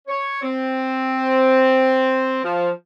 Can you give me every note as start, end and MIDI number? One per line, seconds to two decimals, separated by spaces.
0.07 0.42 73
0.43 2.40 60
2.43 2.69 53